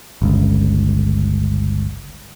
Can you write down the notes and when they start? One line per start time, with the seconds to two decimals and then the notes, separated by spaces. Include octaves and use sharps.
0.22 G1 C#2